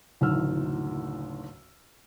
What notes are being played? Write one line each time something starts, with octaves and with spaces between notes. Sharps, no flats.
F#1 D2 A2 D#3 E6 F6